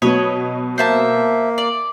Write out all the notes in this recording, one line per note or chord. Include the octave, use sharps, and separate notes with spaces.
B2 F#3 B3 C#5 D#5 B5
A#3 C5 E5 A5
D5